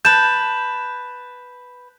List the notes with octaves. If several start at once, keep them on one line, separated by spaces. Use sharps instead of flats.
B4 A5 G6 E7